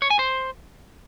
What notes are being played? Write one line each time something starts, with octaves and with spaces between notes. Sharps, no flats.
C#5
G#5
C5